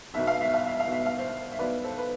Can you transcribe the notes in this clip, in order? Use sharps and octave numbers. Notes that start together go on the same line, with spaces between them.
B1 B2 E5
F5
E5
F5
E5
F5
B1 B2
E5
F5
C5 E5
E5
B1 B2 B4 D5
A4 C5
B4